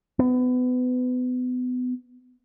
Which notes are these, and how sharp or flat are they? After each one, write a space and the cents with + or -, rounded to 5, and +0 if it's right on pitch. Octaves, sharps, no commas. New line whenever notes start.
B3 +30